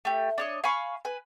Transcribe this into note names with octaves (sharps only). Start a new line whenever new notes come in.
A3 G4
D4 C#5 D#5
F5 G#5 B5 C#6
B4 G#5